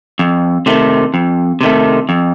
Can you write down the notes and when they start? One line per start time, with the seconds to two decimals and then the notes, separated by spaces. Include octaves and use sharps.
0.19 F2
0.66 C3 D#3 A3
1.14 F2
1.61 C3 D#3 A3
2.09 F2